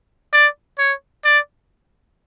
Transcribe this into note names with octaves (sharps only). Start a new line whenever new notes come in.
D5
C#5
D5